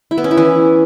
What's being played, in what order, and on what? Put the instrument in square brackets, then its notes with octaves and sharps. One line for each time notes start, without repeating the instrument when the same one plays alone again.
[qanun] E4
B3
C#4
E4
E3